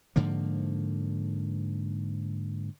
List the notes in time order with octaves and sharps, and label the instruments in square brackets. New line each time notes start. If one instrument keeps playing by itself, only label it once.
[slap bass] G#2 D3 F3 A#3